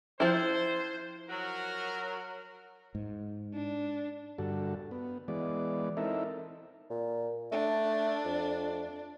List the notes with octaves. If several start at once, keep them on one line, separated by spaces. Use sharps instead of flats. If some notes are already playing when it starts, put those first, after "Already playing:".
F3 E4 C5
F#3 F#4 A#4
G#2
D4
G2 D3 F#4 A4
B3
E3 G#3 B3 D5
C4 D#4 E4 A4 A#4 E5
A#2
A3 D4
F2